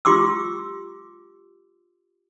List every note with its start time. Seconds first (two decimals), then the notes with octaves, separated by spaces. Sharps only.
0.05 F4 G4 C6 D6 E6